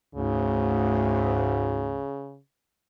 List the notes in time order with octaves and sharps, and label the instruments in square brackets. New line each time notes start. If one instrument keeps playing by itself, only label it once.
[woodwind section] D2 G#2 [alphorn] C#3